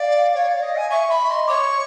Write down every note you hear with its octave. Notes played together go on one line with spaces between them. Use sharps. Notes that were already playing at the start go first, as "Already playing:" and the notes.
Already playing: D5 F5
C#5
D5
D#5
G#5
E5 C#6
E5 B5
D#5 C6
C#5 C#6 D6